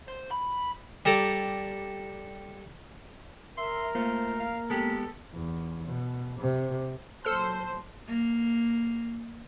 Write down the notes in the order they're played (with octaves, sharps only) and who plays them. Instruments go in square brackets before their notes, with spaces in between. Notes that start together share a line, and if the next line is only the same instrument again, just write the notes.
[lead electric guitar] C5
B5
[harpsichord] G3 A4 A#5 D6
[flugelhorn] A#4 [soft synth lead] E5 [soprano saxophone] C6
[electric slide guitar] A3 F4 [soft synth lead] A#3 [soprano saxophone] C5
[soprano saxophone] F5
[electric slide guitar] G#3 B3 G4 [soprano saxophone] A4
[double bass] E2
B2
C3
[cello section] A#2 F#3 [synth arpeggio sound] A4 E6 F6 [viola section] C5 [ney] A5
[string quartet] A#3